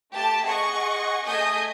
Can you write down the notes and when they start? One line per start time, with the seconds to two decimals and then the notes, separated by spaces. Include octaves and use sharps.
0.12 A3 G4 A5
0.44 G#4 D#5 F#5 C#6
1.25 A3 G#4 D#5 G#5 D#6 G6